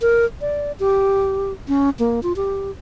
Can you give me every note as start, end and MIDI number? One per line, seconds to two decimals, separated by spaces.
0.02 0.25 70
0.41 0.72 74
0.80 1.53 67
1.68 1.90 61
1.99 2.20 58
2.23 2.33 65
2.36 2.71 67